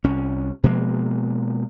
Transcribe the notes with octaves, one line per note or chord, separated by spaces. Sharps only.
C2 C#4
B2 F3 G#3 A#3